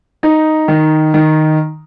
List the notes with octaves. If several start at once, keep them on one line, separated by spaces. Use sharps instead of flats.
D#4
D#3
D#3